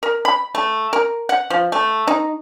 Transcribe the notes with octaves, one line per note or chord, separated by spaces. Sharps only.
A#4
B5
A3
A#4
F#5
F3
A3
D#4